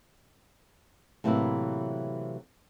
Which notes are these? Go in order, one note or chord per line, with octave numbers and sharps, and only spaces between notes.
A2 C3 E3 F#3 A#3 E4